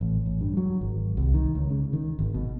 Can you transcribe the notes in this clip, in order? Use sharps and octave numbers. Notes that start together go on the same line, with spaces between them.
A1
A1
G2
F#3
G#1
C2
D#3
C#2
C#3
D#3
G#1
B2